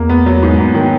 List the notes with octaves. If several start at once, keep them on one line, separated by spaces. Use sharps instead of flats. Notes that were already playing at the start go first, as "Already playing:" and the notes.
Already playing: E2 A#3
B3
F#3
G#2
B3
D#3